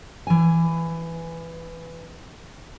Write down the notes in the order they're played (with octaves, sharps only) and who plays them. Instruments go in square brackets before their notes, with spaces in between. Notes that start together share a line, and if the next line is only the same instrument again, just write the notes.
[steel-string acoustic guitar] E3 G#5